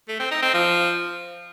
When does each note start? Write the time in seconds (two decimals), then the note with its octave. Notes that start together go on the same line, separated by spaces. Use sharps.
0.08 A3
0.20 C4
0.31 D#4
0.42 C4
0.54 F3